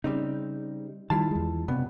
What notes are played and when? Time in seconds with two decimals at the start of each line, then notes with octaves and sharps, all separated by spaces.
0.04 C#3 G3 C4 D#4
1.10 D#3 G3 E4 F4 A5
1.31 E2 G#3
1.68 C#2 G2 C3 B3